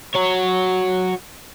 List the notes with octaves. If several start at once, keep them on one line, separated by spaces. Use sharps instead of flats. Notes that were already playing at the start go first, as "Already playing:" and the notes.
F#4 C#5